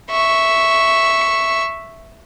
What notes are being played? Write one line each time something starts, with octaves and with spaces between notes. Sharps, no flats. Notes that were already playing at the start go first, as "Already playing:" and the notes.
E5 C#6